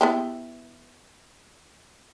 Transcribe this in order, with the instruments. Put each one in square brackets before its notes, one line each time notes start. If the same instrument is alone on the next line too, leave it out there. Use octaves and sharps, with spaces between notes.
[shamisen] B3 E4 G4